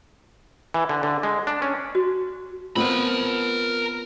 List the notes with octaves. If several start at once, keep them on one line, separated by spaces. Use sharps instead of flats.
E3
D3
D3
G#3
D4
C#4
F#4
B3 C4 F4 A#4 B5